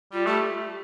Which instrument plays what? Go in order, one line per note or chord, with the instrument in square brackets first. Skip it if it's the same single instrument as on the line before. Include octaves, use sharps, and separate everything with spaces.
[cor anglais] G3 [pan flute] F4
[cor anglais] A3 [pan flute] G4